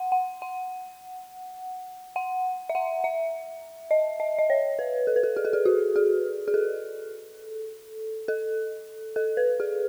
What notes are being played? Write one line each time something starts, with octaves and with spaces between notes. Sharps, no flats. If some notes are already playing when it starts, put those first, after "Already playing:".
Already playing: F#5
F#5
F#5
F#5
E5
F#5
E5
D#5
D#5
D#5
C#5
B4
A4
B4
A4
G#4
A4
G#4
F#4
G#4
G#4
A4
A4
A4
B4
G#4